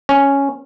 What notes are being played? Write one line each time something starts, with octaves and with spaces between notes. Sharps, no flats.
C#4